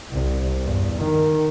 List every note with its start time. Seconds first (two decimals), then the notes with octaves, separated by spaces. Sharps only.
0.11 C2
0.63 E2 G2
0.97 D#3